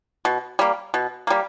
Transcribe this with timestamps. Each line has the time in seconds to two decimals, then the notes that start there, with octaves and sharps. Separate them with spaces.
0.25 B2
0.59 G3 A#3
0.94 B2
1.27 G3 A#3